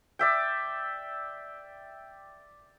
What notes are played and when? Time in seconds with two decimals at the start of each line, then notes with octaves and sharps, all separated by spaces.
0.19 D5 E5 G5